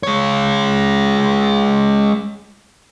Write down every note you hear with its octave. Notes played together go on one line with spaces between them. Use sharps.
G#3 C#5